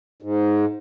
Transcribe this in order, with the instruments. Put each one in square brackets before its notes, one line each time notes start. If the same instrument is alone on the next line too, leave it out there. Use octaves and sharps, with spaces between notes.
[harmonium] G#2